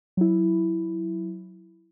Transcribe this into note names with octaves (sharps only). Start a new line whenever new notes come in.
F#3 E4